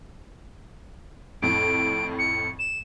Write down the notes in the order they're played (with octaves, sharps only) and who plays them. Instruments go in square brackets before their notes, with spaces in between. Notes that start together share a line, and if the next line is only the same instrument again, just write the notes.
[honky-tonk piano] F2 A2 [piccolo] D7
[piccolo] C#7
E7